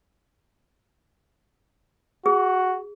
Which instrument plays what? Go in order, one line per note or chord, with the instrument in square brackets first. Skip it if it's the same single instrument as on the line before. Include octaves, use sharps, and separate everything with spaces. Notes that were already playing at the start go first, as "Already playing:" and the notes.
[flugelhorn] F#4 [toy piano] G#4